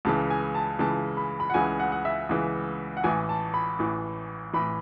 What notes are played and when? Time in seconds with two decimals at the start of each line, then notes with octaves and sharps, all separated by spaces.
0.05 C#2 C#3 E3 A5
0.30 G#5
0.55 A5
0.79 C#2 C#3 E3 A5
1.17 B5
1.40 B5
1.50 F#5
1.54 C#2 C#3 E3 G#5
1.80 F#5
1.92 F#5
2.05 E5
2.29 C#2 C#3 E3
2.97 F#5
3.04 A1 A2 E3 G#5
3.29 A5
3.54 B5
3.79 A1 A2 E3
4.53 A2 E3 B5